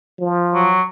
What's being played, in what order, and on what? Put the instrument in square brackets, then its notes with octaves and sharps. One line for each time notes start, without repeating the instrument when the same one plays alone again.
[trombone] F3
[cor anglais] F#3